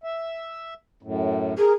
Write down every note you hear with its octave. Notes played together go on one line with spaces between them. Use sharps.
E5
F#2 A2
G#4 A#4